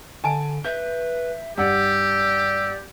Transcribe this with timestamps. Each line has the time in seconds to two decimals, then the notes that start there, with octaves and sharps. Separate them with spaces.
0.24 D3 G#5 A5 D7
0.65 B4 E5 G6
1.58 G2 G4 D5 F#5 E6